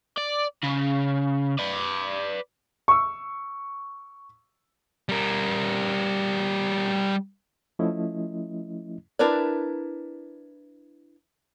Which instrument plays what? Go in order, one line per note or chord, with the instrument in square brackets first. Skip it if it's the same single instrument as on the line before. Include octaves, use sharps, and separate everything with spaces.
[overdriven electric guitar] D5
C#3
B4 D5
[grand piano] C#6 E6
[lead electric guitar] G3 A#4
[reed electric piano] F3 A3 C#4 E4 D#5
[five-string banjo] D4 E4 A#4 B4 D5